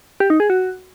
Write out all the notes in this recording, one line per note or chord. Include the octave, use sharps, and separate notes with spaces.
G4
D#4
G#4
F#4